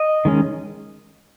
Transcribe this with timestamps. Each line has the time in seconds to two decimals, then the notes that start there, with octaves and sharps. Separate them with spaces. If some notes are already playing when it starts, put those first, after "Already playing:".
Already playing: D#5
0.25 D#3 G#3 C#4